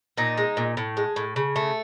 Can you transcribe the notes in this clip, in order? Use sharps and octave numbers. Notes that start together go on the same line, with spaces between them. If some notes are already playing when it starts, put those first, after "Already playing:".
A#2 D#4
G#3
A#2
A2
G#3
A2
C#3
A3